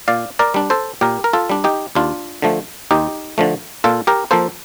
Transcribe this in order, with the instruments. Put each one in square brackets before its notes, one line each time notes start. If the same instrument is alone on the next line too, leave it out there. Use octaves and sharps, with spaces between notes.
[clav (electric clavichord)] A#2 D5 F5
A#4 D5
G3 D4
A4 C5
A#2 G4 A#4
A#4
F4 A4
G3 D4
D#4 G4
D#2 D4 F4
D3 F3 A3
D#2 D#4 G4
D3 F3 A3
A#2 F4 A4
G4 A#4
F3 A#3 A4 C5